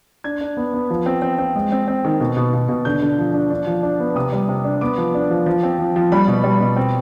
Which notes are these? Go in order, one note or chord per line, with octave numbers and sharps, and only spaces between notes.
D4 G#6
D4
B3
B3
F3
C4
C4
C4
G#3
C4
C4
D#3
B2
B2
B2
B2
D3 G6
D3
F3
D4
D4
F3
D4
B3
C3 D#6
G3
C3
D4
B3 D6
F3
D4
F3
F3
C4
F3
F3
G3 B5
B2
G3
B2
C4